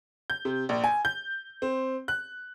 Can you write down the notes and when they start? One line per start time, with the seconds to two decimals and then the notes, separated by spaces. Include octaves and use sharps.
0.30 G6
0.45 C3
0.69 A#1
0.84 G#5
1.05 G6
1.62 C4
2.08 F#6